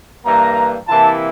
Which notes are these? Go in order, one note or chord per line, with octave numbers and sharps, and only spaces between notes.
G2 E3 A#3 A#5
C3 E3 A#3 E4 A5